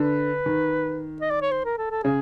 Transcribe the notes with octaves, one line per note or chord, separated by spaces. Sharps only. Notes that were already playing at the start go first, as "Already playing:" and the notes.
Already playing: D3 B4
D#3
D#5
D5
C#5
C5
A#4
A4
A4
C#3 G#4